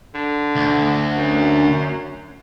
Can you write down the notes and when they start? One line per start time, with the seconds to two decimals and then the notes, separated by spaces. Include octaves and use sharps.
0.15 D3
0.56 D2
1.14 F#2